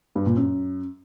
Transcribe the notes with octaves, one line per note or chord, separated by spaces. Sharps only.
G2
A#2
F#2